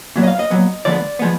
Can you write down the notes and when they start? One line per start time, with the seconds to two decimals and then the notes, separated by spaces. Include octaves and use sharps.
0.16 A#2 F#3 B3
0.23 D#5
0.28 F5
0.39 D#5
0.50 A#2 F#3 B3
0.85 D3 F3 G#3 B3 D5
1.19 F3 G#3 B3